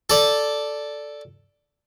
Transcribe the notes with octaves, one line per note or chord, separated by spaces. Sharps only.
A4 D5